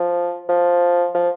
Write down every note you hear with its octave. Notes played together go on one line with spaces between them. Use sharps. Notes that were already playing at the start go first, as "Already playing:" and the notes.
Already playing: F3
F3
F3